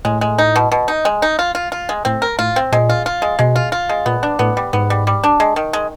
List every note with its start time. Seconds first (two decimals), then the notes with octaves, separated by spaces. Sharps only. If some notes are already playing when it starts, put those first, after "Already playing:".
0.05 A2 G#3
0.21 G#3
0.38 D#4
0.56 B2
0.72 B2
0.88 D#4
1.05 G#3
1.22 D#4
1.39 F4
1.55 F4
1.72 F4
1.89 G#3
2.05 A2 C4
2.22 A#4
2.39 A2 F4
2.56 C4
2.72 A#2 G#3
2.89 F4
3.06 F4
3.22 G#3
3.39 B2 G#3
3.56 F4
3.72 F4
3.89 G#3
4.06 A#2 B3
4.23 D4
4.39 A2 B3
4.57 G3
4.73 G#2 B3
4.90 G3
5.07 G3
5.24 D4
5.40 G#3
5.56 D#3
5.73 G#3